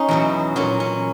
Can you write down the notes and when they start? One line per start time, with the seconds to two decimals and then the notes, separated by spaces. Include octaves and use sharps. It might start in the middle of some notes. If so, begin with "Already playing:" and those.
Already playing: C#4 D#4 G#4
0.09 E2 B2 F#3
0.56 A#2 F#3 C#4
0.80 C#4